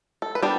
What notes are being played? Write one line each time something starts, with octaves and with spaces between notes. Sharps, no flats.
A4
B4
G3 B3 D4 D5